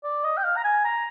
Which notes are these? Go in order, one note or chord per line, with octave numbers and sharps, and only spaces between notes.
D5
D#5
G5
F5
A#5
G#5
A#5